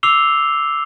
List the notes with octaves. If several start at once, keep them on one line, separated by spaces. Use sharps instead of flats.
D6 E6 C7 F7 G7